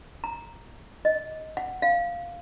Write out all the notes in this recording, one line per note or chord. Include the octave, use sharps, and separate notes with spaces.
A#5
D#5
F#5
F5